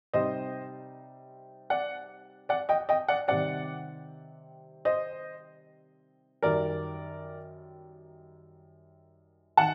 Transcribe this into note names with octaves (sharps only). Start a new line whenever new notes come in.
C3 G3 C4 D#4 C5 D#5
D5 F#5
D5 F#5
D#5 G5
D#5 G5
D5 F#5
C3 D#3 G3 C4 D5 F#5
C5 D#5
F#2 D#3 G3 A#4 D5
D#3 F#5 A5